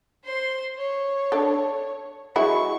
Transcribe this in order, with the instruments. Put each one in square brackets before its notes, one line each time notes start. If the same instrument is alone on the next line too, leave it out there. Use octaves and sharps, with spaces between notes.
[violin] C5 C6
C#5
[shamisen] D4 A4
[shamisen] F#3 G#3 E4 [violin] C#6